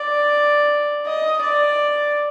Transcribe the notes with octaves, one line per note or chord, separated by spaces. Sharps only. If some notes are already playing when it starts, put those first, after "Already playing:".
Already playing: D5
D#5
D5